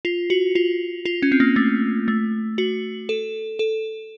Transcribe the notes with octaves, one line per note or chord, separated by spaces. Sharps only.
F4
F#4
F4
F4
C#4
C4
A#3
A3
A3
F#4
A4
A4